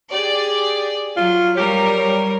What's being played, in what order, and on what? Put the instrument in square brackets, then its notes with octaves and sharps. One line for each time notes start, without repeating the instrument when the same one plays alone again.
[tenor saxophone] G4 [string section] G#4 D5
[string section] F#3 [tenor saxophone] F4
[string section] G3 A#4 C#5 [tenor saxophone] G4